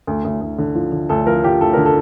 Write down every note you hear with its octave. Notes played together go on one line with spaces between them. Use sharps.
D2
D2
D2
D3
F3
D3
D2 A4
F3 A#4
F3 G4
D2 A4
D3 A#4
A4